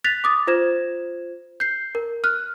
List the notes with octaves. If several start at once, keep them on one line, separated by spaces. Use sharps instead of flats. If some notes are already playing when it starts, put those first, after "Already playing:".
F#6 A6 B6 F7
D6 D#6 A6
F4 C5 G#6 E7
G6 C7
A#4
F6 F#6